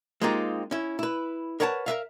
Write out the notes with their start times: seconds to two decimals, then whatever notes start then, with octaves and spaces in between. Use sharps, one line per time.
0.21 G#3 A#3 C4 D#4 F4 G4
0.71 C#4 E4
0.99 E4 B4
1.60 A#4 B4 C#5 F#5 G#5 A5
1.86 A#4 B4 E5 F5